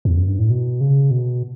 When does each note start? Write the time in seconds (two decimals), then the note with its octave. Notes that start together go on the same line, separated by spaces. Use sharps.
0.05 E2
0.17 F#2
0.27 G2
0.39 A2
0.50 B2
0.81 C#3
1.11 B2